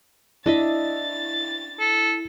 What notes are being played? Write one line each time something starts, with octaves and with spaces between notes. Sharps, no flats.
D4 E4 D#5 E5 A6
A4